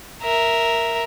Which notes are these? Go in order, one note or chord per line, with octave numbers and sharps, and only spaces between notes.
A#4 E5